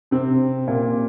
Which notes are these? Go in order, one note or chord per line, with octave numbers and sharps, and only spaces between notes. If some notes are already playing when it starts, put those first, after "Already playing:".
C3 C4
A#2 A#3